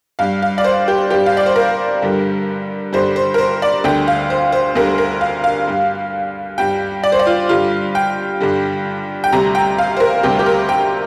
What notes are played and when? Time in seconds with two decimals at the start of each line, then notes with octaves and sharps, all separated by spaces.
0.19 G2 G3 F5
0.42 F5
0.58 D5
0.64 C5
0.88 G4
1.10 G2 G3 G4
1.26 F5
1.37 D5
1.46 C5
1.56 A#4
2.02 G2 D3 G3
2.93 G2 D3 G3 C5
3.16 C5
3.34 A#4
3.38 C5
3.62 D5
3.84 D2 D3 G3 G5
4.08 F5
4.30 C5
4.52 C5
4.75 D2 D3 G3 A#4
4.98 A#4
5.21 F5
5.44 F5
5.67 G2 G3
6.58 G2 G3 G5
7.04 D5
7.12 C5
7.19 D5
7.27 F4
7.49 G2 D3 G3 F4
7.95 G5
8.40 G2 D3 G3
9.24 G5
9.33 D2 C3 G3 A#5
9.55 G5
9.78 F5
9.97 C5
10.00 A#4
10.23 D2 C3 G3 G4
10.39 G4
10.46 A#4
10.69 G5